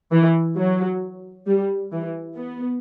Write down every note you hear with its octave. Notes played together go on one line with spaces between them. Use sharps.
E3
F#3
G3
E3
B3